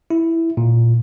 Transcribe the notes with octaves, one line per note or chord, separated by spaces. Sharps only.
E4
A#2